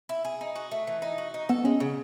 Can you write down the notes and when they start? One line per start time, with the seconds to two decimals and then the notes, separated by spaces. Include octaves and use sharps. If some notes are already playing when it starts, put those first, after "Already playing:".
0.09 E4
0.25 G#4
0.41 D#4
0.56 F#4
0.71 A3
0.87 E3
1.02 D#4
1.18 F#4
1.34 D#4
1.49 B3 A4
1.64 G#3 C#4
1.80 C#3